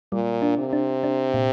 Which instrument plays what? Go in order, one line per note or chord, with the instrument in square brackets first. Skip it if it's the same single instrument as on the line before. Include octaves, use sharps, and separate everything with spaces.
[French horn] A#2 [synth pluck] G3
[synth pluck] D4
[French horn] C3
[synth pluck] D4
D4
A#2